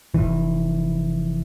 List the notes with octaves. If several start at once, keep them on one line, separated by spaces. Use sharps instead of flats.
F1 C#2 E3